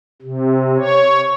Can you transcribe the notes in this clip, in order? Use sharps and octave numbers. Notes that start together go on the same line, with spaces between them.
C3
C#5